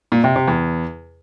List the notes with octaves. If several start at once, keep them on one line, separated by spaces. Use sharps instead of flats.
A#2
C3
C3
E2